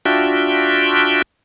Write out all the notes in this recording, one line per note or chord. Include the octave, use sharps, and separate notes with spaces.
D4 F4 F#4 E5 G5